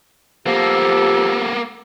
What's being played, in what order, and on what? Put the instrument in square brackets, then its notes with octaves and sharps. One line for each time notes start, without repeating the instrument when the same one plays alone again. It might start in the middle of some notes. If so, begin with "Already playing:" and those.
[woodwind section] F3 G4 A4 [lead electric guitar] A#3 B3